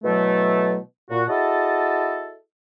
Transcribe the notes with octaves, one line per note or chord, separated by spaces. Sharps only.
B2 E3 F#3 A3
A#2 F#4
E4 F#4 G#4 A4 D#5 A5